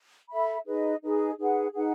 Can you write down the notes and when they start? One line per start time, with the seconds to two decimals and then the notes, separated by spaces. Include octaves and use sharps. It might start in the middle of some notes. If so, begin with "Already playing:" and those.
0.29 A4 E5 B5
0.65 D#4 G#4 B4 D#5
1.02 D#4 G#4 B4 D#5
1.38 D#4 G#4 B4 F#5
1.74 D#4 G#4 B4 F#5